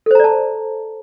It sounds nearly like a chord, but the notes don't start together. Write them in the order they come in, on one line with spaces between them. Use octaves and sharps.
A4 C5 A#5 D5 A5